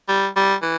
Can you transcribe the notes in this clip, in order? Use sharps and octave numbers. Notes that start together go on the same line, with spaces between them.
G3
G3
E3